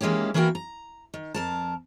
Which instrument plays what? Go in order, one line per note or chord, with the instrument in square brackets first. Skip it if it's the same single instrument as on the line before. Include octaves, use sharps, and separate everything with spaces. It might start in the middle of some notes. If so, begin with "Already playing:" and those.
[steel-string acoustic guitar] D#3 E3 G#3 A#3 C#4 G4
E3 A#3 B3 F#4 A#4 G5
A#5
D#3
F2 A#4 A5